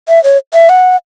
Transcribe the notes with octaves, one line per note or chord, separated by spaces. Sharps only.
E5
C#5
E5
F#5